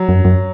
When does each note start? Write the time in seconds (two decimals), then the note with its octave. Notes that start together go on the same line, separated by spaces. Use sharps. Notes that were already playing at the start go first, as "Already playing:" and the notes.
Already playing: F#3
0.09 F#2
0.25 F#2